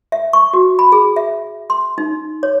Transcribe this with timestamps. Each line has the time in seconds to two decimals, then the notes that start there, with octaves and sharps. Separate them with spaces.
0.12 E5
0.33 C#6
0.53 F#4
0.79 B5
0.92 G#4
1.16 E5
1.70 C6
1.98 D#4
2.43 C#5